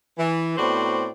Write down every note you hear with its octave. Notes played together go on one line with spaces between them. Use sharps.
E3
A2 B3 C4 F#4 C5 D5